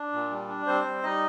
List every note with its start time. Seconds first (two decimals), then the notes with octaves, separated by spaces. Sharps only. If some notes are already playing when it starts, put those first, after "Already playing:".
Already playing: D4
0.12 A#2
0.30 G3
0.48 D4
0.67 G3 C4 C5
0.86 G3
1.03 G3 D#4 D#5